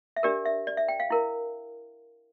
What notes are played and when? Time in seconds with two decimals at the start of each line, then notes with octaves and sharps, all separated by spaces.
0.16 E5
0.23 D4 G4 A#4 D5
0.46 E5
0.67 D5
0.77 E5
0.88 G5
1.00 F5
1.10 E4 A#4